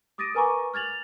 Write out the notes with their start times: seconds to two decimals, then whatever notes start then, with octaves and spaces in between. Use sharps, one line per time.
0.18 D6 D#6 A6 A#6 D7 D#7
0.35 A#4 B4 G#5 A#5 C#6 D6
0.74 F6 G#6 A6 F7 F#7